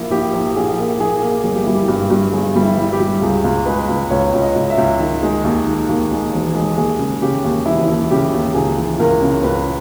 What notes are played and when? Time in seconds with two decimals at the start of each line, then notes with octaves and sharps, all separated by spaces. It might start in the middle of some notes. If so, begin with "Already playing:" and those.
Already playing: A#1 A#3 E4
0.11 A#1 G4
0.33 A#1
0.56 A#1 G#4
0.78 A#3
0.99 A#1 G#4
1.22 A#3
1.44 G1 G#4
1.55 G4
1.64 G3 E4
1.74 G4
1.88 G2
2.10 G2
2.33 G1 G#4
2.56 G3
2.63 E4
2.77 G1
2.93 G4
3.00 G3
3.22 C#2 G#4
3.44 C#2
3.66 G#3 B4
3.89 C#2
4.10 C#2 C#5
4.33 C#2
4.41 D#5
4.56 C#2
4.70 E5
4.78 C#2
5.00 D#3
5.23 G#3
5.44 D#2
5.67 D#3
5.89 D#2
6.11 G#3
6.33 E1
6.55 G#3
6.77 D#2 G#4
6.99 C#3
7.22 C#3 G4
7.44 D#2
7.66 E1 E4
7.88 D#2
8.11 C#3 G4
8.33 D#2
8.54 C#2 G#4
8.78 E3
8.99 C#2 A#4
9.22 C#3
9.43 C#2 B4